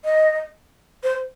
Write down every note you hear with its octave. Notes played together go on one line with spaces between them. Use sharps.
D#5
C5